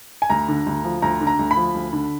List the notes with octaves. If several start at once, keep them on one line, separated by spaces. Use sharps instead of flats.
G#5
D2 A#5
D3
D2
F3
D2 A#5
D3
A#5
D2
B5
F3
D2
D3